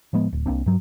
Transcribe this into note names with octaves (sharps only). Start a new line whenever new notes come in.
A2 F3 G#3 B3
D1
C2 A#3 C4 D4
G2 F#3